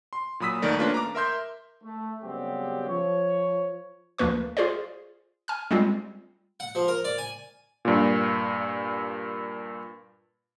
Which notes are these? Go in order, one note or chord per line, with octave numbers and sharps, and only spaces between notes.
C6
A#2 F#3 B5 D#6 E6 B6
D#2 D#3 A3 A#4 D5
A3 A#3 C#4 D4 F4 B4
A#5 D6
A#4 E5 C6 G6
A3
F#2 C#3 G3 B3 C4 G4
F3 C#5
D2 F3 A#3 B4 C#6
F4 G#4 C5 D5
G#5 F6
G3 G#3 C4 F4
F#5
F3
A#4
D5
G#5
G2 A#2